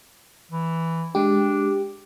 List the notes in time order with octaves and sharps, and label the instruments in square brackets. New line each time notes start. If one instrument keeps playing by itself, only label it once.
[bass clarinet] E3
[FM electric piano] G#3 G4 [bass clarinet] D4